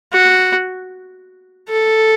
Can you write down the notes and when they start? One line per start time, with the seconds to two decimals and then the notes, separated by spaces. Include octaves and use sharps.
0.13 F#4
1.69 A4